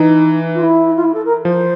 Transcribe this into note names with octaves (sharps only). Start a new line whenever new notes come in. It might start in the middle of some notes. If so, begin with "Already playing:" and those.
Already playing: E3 D#4
F4
E4
F4
E4
A4
A#4
F3 C5